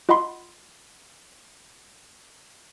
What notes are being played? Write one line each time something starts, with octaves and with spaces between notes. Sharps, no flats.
F4 D#5 F#5 B5 C6